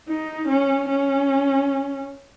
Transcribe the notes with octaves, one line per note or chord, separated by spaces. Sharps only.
D#4
C#4
C#4